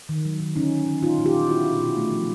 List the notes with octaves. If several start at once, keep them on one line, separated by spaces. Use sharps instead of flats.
D#3
F#3
D#3
D3 C#4 D#4
D3
D3
A#2 D#4 F4
A#2
F4 G4
A#2
B3 E4 F#4
B2
B2
A3
F3